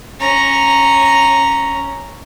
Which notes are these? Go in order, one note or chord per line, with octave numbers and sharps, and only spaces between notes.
C#4 A#5